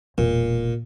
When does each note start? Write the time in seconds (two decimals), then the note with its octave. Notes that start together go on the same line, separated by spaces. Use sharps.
0.18 E1 A#2